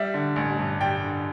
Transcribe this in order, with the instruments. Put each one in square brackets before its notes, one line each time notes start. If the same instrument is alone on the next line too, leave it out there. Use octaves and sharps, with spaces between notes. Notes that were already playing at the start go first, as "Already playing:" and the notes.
Already playing: [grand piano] G3 E5
D3
A1
G2
G3 G5
D3